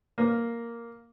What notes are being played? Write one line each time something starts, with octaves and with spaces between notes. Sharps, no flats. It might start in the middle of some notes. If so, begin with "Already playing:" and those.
A#3